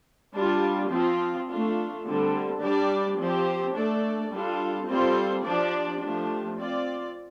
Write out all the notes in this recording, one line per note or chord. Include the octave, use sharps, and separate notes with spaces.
G3 D4 F4
F3 C4 F4
A3 D4 F4
D3 G3 C4 A4
G3 D4 G4 D5
F3 C4 G4 C5
A3 D4 A4 D5
G3 D4 F4 A4
G3 C4 F4 A4 C5
F3 D4 G4 D5
F3 A3 D4 G4
C4 F4 D5